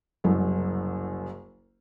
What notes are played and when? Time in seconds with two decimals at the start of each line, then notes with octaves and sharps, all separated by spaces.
0.24 F#1 C2 F#2